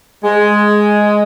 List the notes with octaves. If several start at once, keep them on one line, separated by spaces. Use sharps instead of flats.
G#3